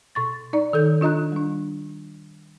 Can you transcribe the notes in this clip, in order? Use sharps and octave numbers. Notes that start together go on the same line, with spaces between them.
B2 C#6 A6
D#4 D5 A#5
D#3 A4 G6
D4 F4 D#5 A#5 F#6
G3 D4